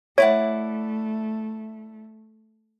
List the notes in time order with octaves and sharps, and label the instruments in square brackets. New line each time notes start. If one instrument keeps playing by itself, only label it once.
[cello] A3 [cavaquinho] E4 D5 F#5 [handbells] C#5